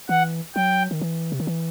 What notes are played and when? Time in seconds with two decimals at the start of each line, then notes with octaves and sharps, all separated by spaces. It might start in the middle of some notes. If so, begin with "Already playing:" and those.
0.09 E3 F#5
0.55 F#3 G5
0.91 D#3
1.01 E3
1.32 C3
1.40 D#3
1.47 E3